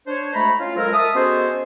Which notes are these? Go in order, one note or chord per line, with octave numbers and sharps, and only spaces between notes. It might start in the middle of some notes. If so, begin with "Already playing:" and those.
D4 C5 C#5
D2 G#3 A3 A#5 B5
C#4 F4
F3 F#3 G#3 A4 A#4
E5 A5 D#6
G#3 B3 C#4 F#4 A4 C5